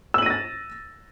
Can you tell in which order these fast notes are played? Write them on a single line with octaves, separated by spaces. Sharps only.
E6 F#7 D#7 A#6 A6